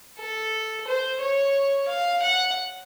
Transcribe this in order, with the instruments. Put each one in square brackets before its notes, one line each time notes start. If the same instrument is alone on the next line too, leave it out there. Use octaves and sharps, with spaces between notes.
[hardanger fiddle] A4
C5
C#5
F5
F#5